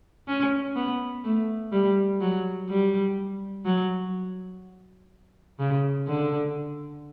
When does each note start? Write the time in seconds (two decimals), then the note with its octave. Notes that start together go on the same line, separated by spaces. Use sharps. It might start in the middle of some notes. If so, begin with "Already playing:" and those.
0.28 C#4
0.76 B3
1.24 A3
1.72 G3
2.21 F#3
2.69 G3
3.66 F#3
5.59 C#3
6.07 D3